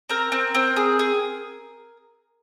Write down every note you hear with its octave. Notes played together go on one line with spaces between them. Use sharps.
C4 A#4
C4
C4
G#4
G#4